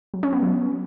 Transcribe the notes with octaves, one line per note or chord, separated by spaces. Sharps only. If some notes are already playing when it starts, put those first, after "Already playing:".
F#3
C#4
B3
F#3